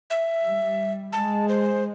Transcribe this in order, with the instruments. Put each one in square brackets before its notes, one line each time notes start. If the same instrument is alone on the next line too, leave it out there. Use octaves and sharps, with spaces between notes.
[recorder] E5
[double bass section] G3
[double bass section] G#3 [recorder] A5
[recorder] C5